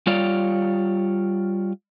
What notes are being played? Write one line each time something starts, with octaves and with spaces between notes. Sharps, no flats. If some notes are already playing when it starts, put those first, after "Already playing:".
G3 F4 C#5 D5 F5